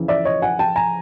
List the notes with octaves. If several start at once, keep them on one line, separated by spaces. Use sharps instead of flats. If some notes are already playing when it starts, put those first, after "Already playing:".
Already playing: F2 C#3 E3
D5 E5
C#5 D#5
F#5 G#5
G5 A5
G#5 A#5